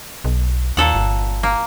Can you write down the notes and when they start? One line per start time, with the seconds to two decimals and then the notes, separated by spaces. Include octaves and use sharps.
0.24 B1
0.77 D#2 A#2 A4 F#5
0.95 G1
1.43 A#3